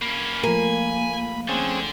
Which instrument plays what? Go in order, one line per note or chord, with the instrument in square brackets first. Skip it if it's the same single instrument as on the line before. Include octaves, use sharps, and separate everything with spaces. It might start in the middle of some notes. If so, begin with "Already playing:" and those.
[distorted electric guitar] A#3 C#4 [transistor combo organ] B5
[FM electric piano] F3 A3 [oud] A#3 [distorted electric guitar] G#5
[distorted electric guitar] D3 [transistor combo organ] C4 C#4 G#4